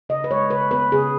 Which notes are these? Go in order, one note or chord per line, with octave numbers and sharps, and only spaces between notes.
C#3 D#5
B4
G#3 C#5
C#3 B4
B3 B4
C#3 G#4